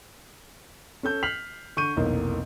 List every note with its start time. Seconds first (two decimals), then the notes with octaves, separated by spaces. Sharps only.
1.03 C#4 A4 G6
1.23 F6 B6 C7 F7 F#7
1.77 D3 C#6 G6 D#7
1.97 F1 B1 E3 A#3